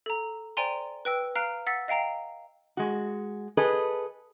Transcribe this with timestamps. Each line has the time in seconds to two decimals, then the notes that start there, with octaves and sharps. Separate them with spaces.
0.06 A4 A#5
0.57 C5 D5 G5 G#5 A#5 C6
1.05 B4 G5 E6
1.35 F5 A#5 F6 F#6 C7 D7
1.67 F#5 E6 A6 B6
1.88 D#5 F5 G5 A#5 C7
2.77 G#3 F#4
3.57 G#4 A4 B4 D#5